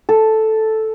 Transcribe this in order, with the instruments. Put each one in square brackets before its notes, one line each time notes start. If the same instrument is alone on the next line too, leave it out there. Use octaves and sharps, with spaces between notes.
[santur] A4